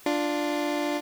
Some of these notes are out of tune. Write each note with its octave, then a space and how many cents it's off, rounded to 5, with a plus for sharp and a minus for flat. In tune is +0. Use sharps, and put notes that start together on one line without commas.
D4 +5 F4 +0